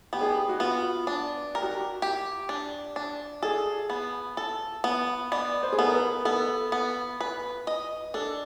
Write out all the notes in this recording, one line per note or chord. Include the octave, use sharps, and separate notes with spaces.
B3 G4
G#4
G4
F#4
B3 F4
D4
G4 A#4
F#4
G4
G4
D4
D4
G#4 A4
B3
A4
B3
B3 D5
C5
G#4
B3 A4
A#4
B4
B3 A4
B3
B4
D#5
D4 A4